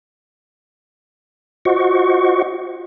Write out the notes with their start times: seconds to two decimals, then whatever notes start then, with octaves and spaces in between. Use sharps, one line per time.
1.65 F4 F#4 C5 D#5 F#5 C#6